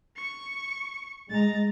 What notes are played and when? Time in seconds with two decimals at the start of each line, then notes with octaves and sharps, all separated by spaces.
0.16 C#6
1.30 G#3 A#5 A6